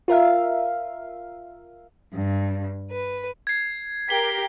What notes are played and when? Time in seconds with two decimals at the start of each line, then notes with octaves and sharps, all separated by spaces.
0.08 F4 A#4 E5 F5
2.13 G2
2.91 B4
3.47 G#6 C7
4.09 G4 A#4 B6 G7